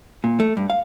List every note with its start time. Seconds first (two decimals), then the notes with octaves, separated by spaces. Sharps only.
0.24 A#2
0.40 A3
0.57 G2
0.70 F5